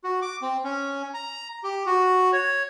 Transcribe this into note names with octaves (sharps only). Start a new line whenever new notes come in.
F#4
D6
C4
C#4
A#5
G4
F#4
C#5